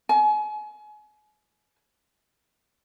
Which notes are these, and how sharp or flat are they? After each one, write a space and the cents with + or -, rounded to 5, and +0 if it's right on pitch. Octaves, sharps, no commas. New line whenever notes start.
G#5 +35